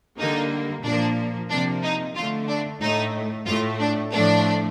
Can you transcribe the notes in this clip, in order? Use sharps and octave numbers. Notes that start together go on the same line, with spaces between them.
D3 G3 A#3 D#4
A#2 F3 A#3 D4
C3 F3 A#3 D4
D#4
D3 A3 F4
D4
A2 A3 D#4
A2 A3 F4
D4
A2 F3 A3 D4